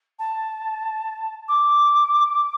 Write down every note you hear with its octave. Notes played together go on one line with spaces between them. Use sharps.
A5
D6